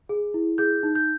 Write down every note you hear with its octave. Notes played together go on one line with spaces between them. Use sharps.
G#4
E4
G#4 G6
D#4
G6